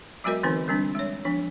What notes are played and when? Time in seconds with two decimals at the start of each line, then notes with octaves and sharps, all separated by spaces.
0.24 F#3 G#3 B3 F#4 A#4 D#5
0.43 D3 E3 B3 C4 D#4 B4
0.68 D3 G3 C4 D4
0.95 G#3 C#5
1.25 F3 B3 D4